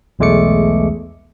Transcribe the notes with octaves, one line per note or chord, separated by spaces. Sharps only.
B1 E2 G#3 A3 D6 C#7